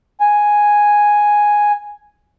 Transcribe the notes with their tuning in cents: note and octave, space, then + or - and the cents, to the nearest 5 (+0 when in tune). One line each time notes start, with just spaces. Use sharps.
G#5 +0